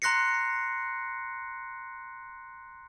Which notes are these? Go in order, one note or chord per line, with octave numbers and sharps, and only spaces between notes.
A#5 C6 F#6 A#6 C7 C#7